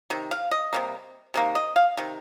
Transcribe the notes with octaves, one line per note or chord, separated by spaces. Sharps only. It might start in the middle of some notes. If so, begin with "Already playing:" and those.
C3 D#3
F5
D#5
C3 D#3 G3 A#3
C3 D#3 A#3
D#5
F5
C3 D#3